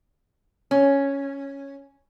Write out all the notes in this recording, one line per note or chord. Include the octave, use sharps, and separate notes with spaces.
C#4